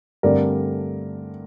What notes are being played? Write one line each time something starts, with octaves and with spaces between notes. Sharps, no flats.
G2 D3 A3 C4 A#4 D5